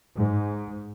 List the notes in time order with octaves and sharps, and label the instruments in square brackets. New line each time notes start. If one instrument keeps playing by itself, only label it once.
[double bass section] G#2